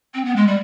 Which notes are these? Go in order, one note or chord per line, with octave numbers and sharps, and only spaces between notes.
C4
B3
G#3
G3